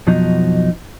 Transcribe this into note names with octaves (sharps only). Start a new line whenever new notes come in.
F2 B2 F3 F#3 D#4